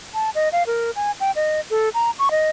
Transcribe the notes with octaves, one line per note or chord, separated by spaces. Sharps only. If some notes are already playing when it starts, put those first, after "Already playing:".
A5
D#5
F5
A#4
G#5
G5
D#5
A4
A#5
C#6
D#5